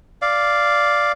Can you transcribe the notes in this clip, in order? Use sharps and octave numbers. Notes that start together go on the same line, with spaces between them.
D5 F5